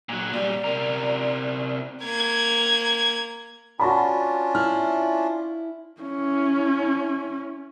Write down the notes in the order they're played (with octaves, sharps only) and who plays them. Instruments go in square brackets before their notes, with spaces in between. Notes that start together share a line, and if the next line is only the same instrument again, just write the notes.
[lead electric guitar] A#2 F#3
[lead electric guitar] A#2 G3 [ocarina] D5
[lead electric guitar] C3 A#4
[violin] A#3 G#6
[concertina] C#4 D4 F4 [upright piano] F#4 A5 B5
[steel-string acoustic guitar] E4 [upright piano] F6
[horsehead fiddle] C#4 E4